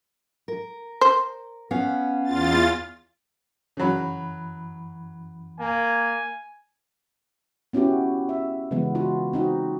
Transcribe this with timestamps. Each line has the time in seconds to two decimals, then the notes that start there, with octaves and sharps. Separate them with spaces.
0.48 A#4
1.01 C5
1.71 B3 C#4 F5
2.24 E2 F4 A6
3.77 F#2 C#3 E3 F#3 B5
5.60 A#3 G#5
7.73 B3 C#4 E4 F#4 G4
8.29 E5
8.71 C#3 E3 G#3 B3
8.95 D4 F4 F#4
9.33 C4 D#4 F#4